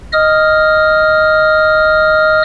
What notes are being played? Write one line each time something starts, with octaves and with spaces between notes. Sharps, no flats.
D#5 D#6 F6